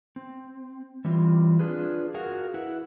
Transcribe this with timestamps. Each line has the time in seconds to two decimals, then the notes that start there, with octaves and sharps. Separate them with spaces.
0.16 C4
1.05 E3 G3 C4 F4
1.59 D4 F4 G#4 B4
2.14 F#4 G#4 A#4 F5 F#5
2.54 E4 B4 F#5